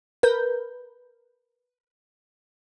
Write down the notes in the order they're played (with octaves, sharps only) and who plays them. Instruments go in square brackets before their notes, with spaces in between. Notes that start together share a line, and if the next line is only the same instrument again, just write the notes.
[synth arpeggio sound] A#4 B4 G6